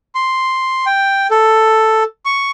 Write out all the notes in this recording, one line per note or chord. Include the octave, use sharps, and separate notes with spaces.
C6
G5
A4
C#6